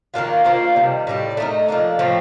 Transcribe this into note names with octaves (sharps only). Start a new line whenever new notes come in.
D#3 A#3 D4 F4
A#3 D4 F4 C5
C3 D#3 G3
A2 G3 D4
A3 D#4 A#4
F3 A#3 D4
A2 F3 A3 C4